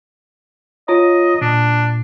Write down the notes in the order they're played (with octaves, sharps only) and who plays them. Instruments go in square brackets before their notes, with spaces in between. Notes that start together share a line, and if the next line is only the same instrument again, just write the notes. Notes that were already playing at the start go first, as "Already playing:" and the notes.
[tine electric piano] F4 C#5 A#5 [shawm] D#5
[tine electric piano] A#2 [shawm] D4